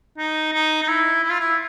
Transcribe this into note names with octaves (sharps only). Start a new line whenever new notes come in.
D#4
D#4
D#4
E4
E4
F4
E4